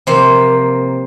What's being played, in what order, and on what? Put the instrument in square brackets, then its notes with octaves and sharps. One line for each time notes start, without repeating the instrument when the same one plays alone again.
[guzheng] C3 F3 A#3 C5